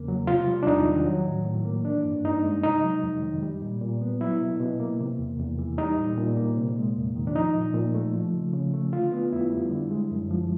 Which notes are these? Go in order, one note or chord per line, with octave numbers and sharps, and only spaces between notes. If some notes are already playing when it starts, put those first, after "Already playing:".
Already playing: E2 C#3 A#3
F#3
C3 F4
G3
D4
E2 D#4
D#3
F#3
A2
A2
A#3
E3 D4
G2
G2 D#4
G#3
C3 D#4
F#3
F2
D#3
G3
A#2
A#2
B3
F#3 E4
B2
B2
A#3
C3
E2
E2
E3
G3 D#4
A#2
A#2
A#3
C3
G#3
E2
D#3
D4
F3 D#4
A#2
A#2
A3
F3
C#3
C#3
A3
D3 F4
B3
F2 E4
G3
D3
G#3
F#2
F3